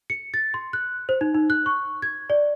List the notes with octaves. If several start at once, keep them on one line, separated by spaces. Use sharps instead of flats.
C#7
A6
C6
F#6
C5
D#4
D#4
F#6
C#6
G#6
D5